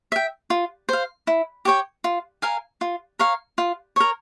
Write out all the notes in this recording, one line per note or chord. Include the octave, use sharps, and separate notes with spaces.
E5 G5
F4
C5 F5
E4
G4 C#5 G5
F4
A#4 F5 G#5
F4
A#4 C#5 F5
F4
A#4 C#5